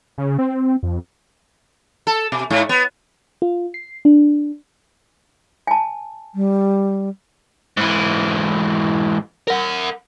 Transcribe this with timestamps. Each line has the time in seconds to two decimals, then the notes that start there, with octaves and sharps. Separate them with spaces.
0.18 C#3
0.39 C4
0.83 F2
2.07 A4
2.32 B2
2.50 G#2
2.69 B3
3.42 F4
3.74 C7
4.05 D4
5.67 G#5 A5
6.35 G3
7.77 G#2 E3
9.48 A#4 F#5